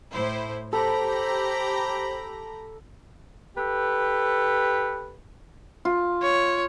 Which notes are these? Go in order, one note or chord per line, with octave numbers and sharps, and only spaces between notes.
A2 E4 C5
G4 A4 C5 A#5 B5
G4 A4 B4
F4
C#5